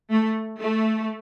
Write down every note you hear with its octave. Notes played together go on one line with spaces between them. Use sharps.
A3
A3